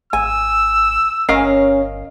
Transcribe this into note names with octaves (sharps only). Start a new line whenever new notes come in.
G#1 G#5 E6
G1 C#4 A#4 D#5 F5